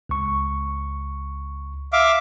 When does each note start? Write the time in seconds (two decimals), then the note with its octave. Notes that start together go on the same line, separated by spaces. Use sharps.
0.09 C#2 C#6
1.93 E5 F5 D6